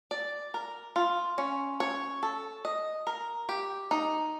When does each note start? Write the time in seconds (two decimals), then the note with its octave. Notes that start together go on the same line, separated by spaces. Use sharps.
0.11 D5
0.54 A#4
0.96 F4
1.38 C#4
1.80 C#5
2.23 A4
2.65 D#5
3.07 A#4
3.49 G4
3.91 D#4